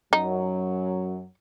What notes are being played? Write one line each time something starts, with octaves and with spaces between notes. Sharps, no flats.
F#2 F#3 D#4